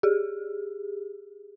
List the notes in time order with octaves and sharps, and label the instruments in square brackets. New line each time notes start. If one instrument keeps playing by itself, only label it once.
[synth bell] G4 G#4